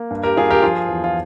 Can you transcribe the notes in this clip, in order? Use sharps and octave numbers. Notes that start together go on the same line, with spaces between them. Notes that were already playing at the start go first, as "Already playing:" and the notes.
Already playing: A#3
G2
G4 A#4
G2 F4 G#4
G4 A#4
F3 F4 G#4
E2
F4